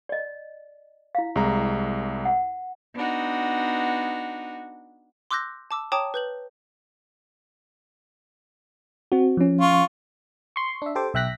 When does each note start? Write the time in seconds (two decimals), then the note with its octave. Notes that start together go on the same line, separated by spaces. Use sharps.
0.09 D5 D#5
1.15 E4 F5
1.36 C2 G#3 A#5
2.25 F#5
2.94 B3 D4 D#4 F#4
5.31 C6 D6 E6 F#6 G6 A#6
5.71 A5 D6 E6
5.92 C#5 G5 A5 A#5 D6 D#6
6.14 B4 G6 F#7
9.12 C4 F#4
9.37 F3 C#4
9.61 F4 C#6
10.56 C6 C#6
10.82 D4 E5
10.95 G4 A4 C5 D6
11.14 B1 E5 G5 F#6 A#6 B6